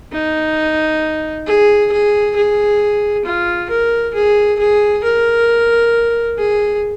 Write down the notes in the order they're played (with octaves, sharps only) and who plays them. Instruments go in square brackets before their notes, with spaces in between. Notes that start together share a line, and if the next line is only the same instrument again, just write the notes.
[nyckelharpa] D#4
G#4
G#4
G#4
F4
A#4
G#4
G#4
A#4
G#4